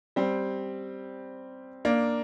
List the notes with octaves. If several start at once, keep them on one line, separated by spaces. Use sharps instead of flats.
G3 C4
A#3 D4